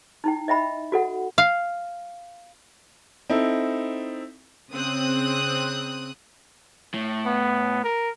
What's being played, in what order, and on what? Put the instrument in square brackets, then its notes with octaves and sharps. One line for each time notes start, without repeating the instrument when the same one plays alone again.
[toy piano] D#4 E4 G5
D#5 E5 G5 B5
F#4 A4 F#5
[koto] F5
[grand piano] C4 D#4 E4 A4
[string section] C#3 C4 D#6 F#6
[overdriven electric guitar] A2
[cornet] B3
A#4